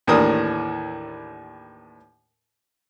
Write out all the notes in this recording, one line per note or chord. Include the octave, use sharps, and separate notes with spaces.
D#2 A2 E3 D4 A#4 D#6